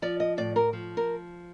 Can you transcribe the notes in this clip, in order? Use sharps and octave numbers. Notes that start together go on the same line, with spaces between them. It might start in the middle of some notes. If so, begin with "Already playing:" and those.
F3 D5
D#5
A2 D5
A#4
F3
A#4